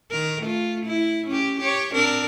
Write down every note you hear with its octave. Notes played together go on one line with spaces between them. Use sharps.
D#3 A#4
A3 F4
E4
C#4 G4
G4 C#5
C4 D4 A#4